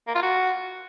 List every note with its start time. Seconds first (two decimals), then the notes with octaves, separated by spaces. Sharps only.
0.07 A#3
0.15 F4
0.23 F#4